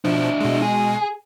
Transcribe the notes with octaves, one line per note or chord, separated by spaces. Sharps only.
B2 F3 D4 E4
B2 G#3
G#4